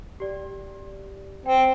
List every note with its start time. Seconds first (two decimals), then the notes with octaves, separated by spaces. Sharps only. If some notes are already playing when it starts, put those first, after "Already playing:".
0.20 G4 D5
1.46 C4 G5